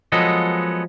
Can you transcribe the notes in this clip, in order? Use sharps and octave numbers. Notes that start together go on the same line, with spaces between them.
F3 F#3 G#3 B3 A4 D#5